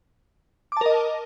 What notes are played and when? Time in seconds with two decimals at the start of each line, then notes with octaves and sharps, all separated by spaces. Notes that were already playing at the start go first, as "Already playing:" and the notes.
0.72 D6
0.77 A5
0.81 A#4
0.86 D#5